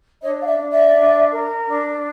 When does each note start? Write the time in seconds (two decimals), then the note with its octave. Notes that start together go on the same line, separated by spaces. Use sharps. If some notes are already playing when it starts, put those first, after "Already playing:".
0.21 D4 C#5 D#5
0.40 F5
0.45 D5 E5
0.57 D4
0.70 D5 E5
0.95 D4
1.30 A#4
1.67 D4